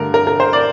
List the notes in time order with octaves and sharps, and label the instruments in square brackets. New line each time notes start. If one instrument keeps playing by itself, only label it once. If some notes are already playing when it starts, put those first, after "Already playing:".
Already playing: [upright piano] G2 D3 A3 A#4
A#4
A#4
C5
D5